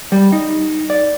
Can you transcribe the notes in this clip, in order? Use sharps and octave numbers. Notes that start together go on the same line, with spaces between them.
G3
D#4
D5